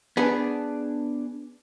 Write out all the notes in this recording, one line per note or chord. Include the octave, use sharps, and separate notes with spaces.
B3 D4 G#4